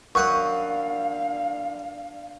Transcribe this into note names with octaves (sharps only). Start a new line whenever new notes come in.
F#2 D4 F5 F#5 C#6 D#6